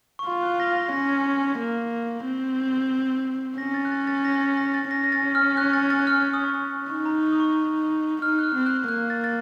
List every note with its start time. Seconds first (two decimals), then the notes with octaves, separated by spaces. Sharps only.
0.19 C#6
0.26 F4 C6
0.43 F#6
0.60 A#6
0.76 A#6
0.93 C#4 A#6
1.59 A#3
2.25 C4
3.58 C#4 A#6
3.74 A6
3.85 F#6
3.92 A6
4.07 A6
4.18 A6
4.25 A#6
4.41 A6
4.57 A#6
4.74 A6
4.91 C#4 A#6
5.04 A#6
5.12 A6
5.35 F6
5.57 F#6
5.73 A6
5.90 A6
5.99 F#6
6.07 F6
6.23 F6
6.34 D#6
6.44 C#6
6.54 D#6
6.90 D#4 C#6
7.06 A#5
7.23 C#6
7.32 D#6
7.40 C#6
8.22 D#4 F6
8.39 F#6
8.44 F6
8.56 C4
8.66 F#6
8.88 A#3 F#6
9.10 A6
9.24 A6